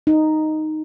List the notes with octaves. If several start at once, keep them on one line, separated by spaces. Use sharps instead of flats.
D#4